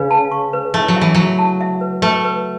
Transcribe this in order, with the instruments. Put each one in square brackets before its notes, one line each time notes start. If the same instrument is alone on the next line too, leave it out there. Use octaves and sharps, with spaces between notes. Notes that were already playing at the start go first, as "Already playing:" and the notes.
Already playing: [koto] C#3 [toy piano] B4
[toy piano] A5
C#6
B4
[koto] A3 [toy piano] E4
[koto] F#3
[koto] E3 [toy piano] E5
[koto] F#3 [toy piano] E4
[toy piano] A5
E5
B4
[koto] A3 [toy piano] B4
[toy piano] B4